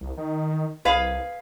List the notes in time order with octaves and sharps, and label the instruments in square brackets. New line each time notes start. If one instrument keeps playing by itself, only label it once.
[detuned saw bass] C2
D#3
[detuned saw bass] C2 [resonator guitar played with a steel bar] G#4 B4 F5